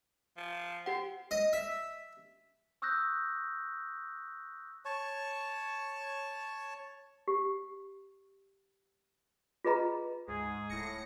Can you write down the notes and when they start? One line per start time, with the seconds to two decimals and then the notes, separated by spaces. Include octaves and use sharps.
0.37 F3
0.86 C4 G4 F#5
1.31 D#5
1.53 E5
2.82 C#6 D#6 E6 F#6 G6 A#6
4.85 C#5 A5 C#6
7.28 G4
9.64 F4 G#4 B4 D#5 A#5 B5
10.27 D2 G#2 G#4
10.69 D1 A2 A#6 C#7